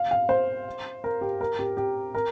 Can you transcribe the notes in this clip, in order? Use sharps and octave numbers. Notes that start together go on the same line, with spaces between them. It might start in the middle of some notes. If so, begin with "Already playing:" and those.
Already playing: F5
F5
C5
A#4
G4
A#4
G4
G4
A#4